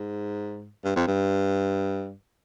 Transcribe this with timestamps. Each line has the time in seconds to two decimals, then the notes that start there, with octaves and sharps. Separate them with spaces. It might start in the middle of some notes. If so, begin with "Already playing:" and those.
Already playing: G#2
0.84 G2
0.96 F2
1.07 G2